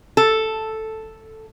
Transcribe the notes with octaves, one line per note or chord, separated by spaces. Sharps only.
A4